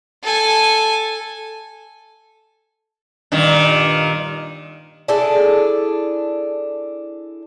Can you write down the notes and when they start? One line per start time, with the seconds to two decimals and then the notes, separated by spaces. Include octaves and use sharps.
0.23 A4 G#5
3.32 G2 A#2 D#3
5.08 D4 E4 G#4 A4